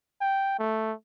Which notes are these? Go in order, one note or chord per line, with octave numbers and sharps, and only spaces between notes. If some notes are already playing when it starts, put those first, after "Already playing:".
G5
A3